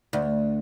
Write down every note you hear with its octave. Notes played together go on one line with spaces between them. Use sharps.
D2